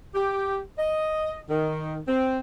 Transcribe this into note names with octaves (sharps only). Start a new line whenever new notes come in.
G4
D#5
D#3
C4